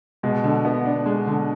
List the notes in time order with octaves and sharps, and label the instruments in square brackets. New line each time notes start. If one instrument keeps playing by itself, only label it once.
[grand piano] B2 [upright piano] G#3
[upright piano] D3
B3
D4
G#3
D3